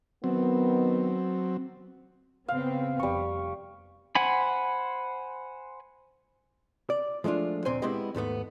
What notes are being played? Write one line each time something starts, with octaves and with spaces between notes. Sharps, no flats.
D#3 F#3 B3 C4
C#3 B3 C4 F5
F1 G3 C#6
C5 F#5 G#5 B5
D5
F3 G#3 A3 D4 F4
D2 A#2 C4 C5 G#5
G#3 B3 C4 E4 G4 D#5
D#2 G#2 A3 B3